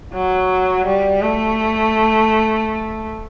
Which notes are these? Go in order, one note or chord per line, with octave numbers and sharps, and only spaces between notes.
F#3
G3
A3